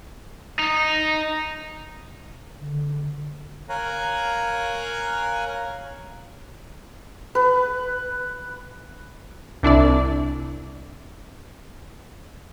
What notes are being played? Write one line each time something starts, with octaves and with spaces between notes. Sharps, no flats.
D#4
D3
A#4 C#5 F5 G#5 A#5 F#6
B4
C2 D4 E4 D5